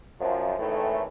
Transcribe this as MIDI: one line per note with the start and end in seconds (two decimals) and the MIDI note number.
0.21 0.59 42
0.21 0.59 53
0.59 1.05 32
0.59 1.05 45
0.59 1.05 51
0.59 1.05 52
0.59 1.05 57